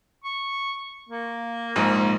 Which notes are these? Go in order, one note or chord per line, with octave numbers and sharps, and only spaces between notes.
C#6
A#3
A#1 G#2